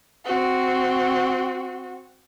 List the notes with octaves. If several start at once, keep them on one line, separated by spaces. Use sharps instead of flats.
C4 F#4